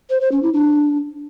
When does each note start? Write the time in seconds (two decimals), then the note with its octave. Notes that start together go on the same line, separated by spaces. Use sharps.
0.10 C5
0.21 C5
0.32 C#4
0.42 E4
0.53 D4